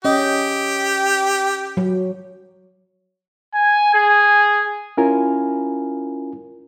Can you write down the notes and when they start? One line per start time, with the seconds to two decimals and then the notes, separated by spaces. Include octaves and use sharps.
0.05 C#4 G4 D#5
1.77 F#3
3.54 G#5
3.94 G#4
4.97 C#4 E4 F4 A#4 G#5